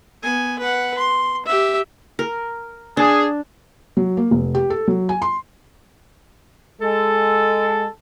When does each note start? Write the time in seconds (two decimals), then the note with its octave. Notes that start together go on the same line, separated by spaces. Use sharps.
0.23 B3 G#5
0.59 B4 F#5
0.98 C6
1.46 G4 E5
2.19 A#4
2.97 D4 G#4
3.97 F#3
4.17 A#3
4.31 F1
4.55 G4
4.70 A4
4.88 F#3
5.09 G#5
5.22 C6
6.81 G#3 A4